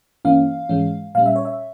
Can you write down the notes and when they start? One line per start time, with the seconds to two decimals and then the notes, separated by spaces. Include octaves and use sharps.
0.25 G2 E3 A#3 C#4 F5
0.69 G#2 E3 G#3 C#4
1.15 A#2 G3 C#4 F5
1.26 E5
1.36 C#5
1.45 E5